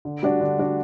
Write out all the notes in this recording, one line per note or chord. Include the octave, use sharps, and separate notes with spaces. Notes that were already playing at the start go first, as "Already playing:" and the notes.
D3
G3 D4 F#4
D3
G3 D4 F#4